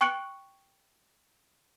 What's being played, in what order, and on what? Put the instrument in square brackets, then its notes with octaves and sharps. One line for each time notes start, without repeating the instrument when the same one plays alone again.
[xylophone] G5 C#6 F#6 C#7 D7 F#7